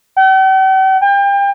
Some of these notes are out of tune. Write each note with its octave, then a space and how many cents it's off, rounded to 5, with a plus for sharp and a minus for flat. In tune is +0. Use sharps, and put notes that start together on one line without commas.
G5 -45
G5 +35